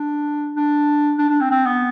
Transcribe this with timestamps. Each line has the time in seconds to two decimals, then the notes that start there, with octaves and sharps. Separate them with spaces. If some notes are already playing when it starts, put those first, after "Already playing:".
Already playing: D4
0.56 D4
1.18 D4
1.29 D4
1.41 C4
1.51 C4
1.66 B3